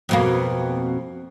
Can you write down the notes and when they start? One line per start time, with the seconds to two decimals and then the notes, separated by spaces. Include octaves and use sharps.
0.09 F2 B2 A#3